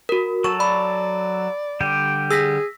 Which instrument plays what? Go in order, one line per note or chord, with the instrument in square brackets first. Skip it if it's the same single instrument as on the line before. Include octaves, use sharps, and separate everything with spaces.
[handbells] F#4 A#4
[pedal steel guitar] F#3 A4 [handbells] C#6
[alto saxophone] D5 [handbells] B5
[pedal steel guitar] D3 G3 G4
[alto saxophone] G#4 [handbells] E6 A#6 B6